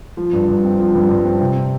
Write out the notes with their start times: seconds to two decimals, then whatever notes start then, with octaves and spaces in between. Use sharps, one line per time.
0.17 F3
0.33 G2
0.48 G2
0.64 C4
0.79 F3
0.95 G2
1.09 G2
1.24 C4
1.41 C3